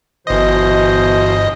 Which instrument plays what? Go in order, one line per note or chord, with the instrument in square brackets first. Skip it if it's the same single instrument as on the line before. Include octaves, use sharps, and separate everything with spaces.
[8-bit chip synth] G1 D#5 [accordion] B2 E3 C5